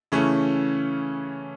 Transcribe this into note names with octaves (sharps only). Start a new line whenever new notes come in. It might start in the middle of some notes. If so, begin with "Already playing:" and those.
C#3 E3 A3 C#4